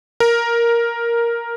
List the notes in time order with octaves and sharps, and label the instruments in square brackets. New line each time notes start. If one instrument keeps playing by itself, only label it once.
[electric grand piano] A#4